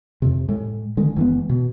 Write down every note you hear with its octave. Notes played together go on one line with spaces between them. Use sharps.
F2 C3
A2 G#3
D3 D#3 G#3
F#1 E3 G#3 B3
B2